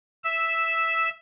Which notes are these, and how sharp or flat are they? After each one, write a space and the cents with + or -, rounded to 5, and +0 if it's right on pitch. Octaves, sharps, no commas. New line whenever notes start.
E5 +0 E6 -10